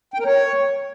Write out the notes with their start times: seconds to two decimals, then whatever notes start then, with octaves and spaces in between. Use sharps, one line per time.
0.14 G5
0.20 A#4
0.25 C#5